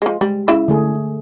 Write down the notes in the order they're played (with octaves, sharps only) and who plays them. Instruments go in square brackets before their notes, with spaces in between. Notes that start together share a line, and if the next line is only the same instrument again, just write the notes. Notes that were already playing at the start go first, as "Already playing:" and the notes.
[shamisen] F3 G#3
[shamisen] G3 [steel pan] G#3
[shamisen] C#3 E4 E5
[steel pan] D3 A3 G#4